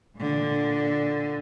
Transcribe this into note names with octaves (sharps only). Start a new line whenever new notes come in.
A#2 D3